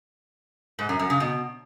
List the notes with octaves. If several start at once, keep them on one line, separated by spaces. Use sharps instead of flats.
G#2
F#2
F#2
C#3
B2